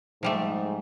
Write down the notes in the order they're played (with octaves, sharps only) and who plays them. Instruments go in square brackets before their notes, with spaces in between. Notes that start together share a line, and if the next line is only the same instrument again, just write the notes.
[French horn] G#2 [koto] F3 G3 A3